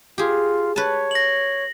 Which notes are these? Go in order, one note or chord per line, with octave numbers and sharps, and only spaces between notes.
F4 G4 G#4
B4 C#5 A5
A#6 F#7